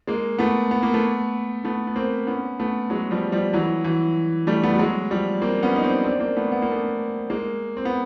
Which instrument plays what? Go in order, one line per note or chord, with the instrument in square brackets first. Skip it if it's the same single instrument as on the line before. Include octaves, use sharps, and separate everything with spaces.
[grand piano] G#3 A#3
A3 B3
B3
A#3
A3 B3
A3 B3
B3
A#3 C4
B3 C#4
A3 B3
F#3 G#3
F3 G3
F3 G3
E3 F#3
E3 F#3
G3 A3
A3 B3
G3
F#3 G#3
F3 G3
A#3 C4
B3 C#4
D#4
C4 D4
C4 D4
A#3 C4
A3 B3
B3
A#3
A3 B3
G#3 A#3
C4
B3